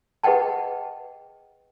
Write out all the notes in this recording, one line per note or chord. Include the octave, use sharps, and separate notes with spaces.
G#4 B4 D#5 F#5 G5 A5